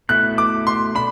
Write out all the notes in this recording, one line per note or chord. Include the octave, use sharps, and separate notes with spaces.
B2 A3 E4 F#6
D6
C6
D4 B5